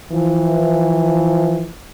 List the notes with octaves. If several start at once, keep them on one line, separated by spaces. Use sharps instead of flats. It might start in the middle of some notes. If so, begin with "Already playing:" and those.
E3 F3